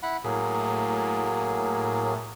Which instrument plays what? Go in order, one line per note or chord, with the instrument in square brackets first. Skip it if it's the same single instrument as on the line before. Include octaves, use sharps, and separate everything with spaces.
[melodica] E4 F#5 B5
[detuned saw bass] A2 [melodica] F#3 A#3 G#4